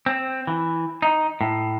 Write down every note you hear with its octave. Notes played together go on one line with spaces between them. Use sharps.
C4
E3
D#4
A2